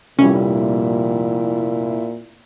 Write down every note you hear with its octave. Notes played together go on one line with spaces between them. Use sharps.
F1 A#1 A#2 G3 C#4 E4